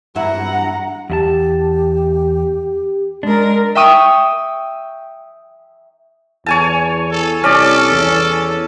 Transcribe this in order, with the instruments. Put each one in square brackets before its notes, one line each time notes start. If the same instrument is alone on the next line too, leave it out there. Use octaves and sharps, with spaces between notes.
[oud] G2 E4 [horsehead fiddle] F#5 A#5
[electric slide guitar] E2 E4 A5 [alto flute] G4
[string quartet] G#3 A#4 [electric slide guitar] D4
[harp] E5 G5 C#6 D#6 E6
[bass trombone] E2 [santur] C#5 G#5 A5
[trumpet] A4
[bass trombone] C2 [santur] C#4 D5 [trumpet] A4
[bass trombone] E2